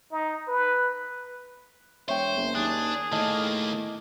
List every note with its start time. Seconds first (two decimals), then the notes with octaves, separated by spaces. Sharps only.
0.11 D#4
0.48 B4
2.08 E1 C5 C#5 E5 G5
2.37 F#1
2.55 D#2 D4 G#4 F#6
3.12 A2 D#3 A#3 D#5 A5